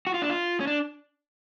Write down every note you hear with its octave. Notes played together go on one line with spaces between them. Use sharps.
F#4
F4
D4
F4
C#4
D4